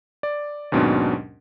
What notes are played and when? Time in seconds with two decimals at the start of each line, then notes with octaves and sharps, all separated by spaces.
0.23 D5
0.72 D#2 G#2 B2 F#3 C#4 D4